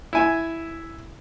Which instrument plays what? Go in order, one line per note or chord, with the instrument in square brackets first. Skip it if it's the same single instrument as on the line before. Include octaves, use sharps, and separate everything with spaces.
[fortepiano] E4 G#5